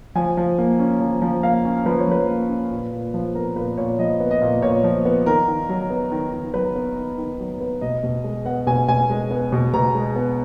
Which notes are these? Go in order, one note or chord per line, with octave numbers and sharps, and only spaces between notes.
F3 G#5
F3
A#3
C#4
F3
F3
A#3 F5
C#4
F3 B4
C#5
F3 B4
A#3
C#4
A#2
A#2
F3
B3 A#4
A#2 B4
A#2 C#5
F3 D#5
B3
D#5
A#2
A#2 C#5
F3
B3
D#3 A#4
D#3
F#3
B3
D#3
D#3
F#3 B4
B3
D#3
D#3
F#3
B3
B2 D#5
B2
G#3
B3 F#5
B2 G#5
B2 G#5
G#3
B3
B2
B2 A#5
G#3
B3